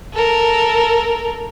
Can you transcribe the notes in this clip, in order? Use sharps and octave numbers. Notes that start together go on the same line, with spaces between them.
A4 A#4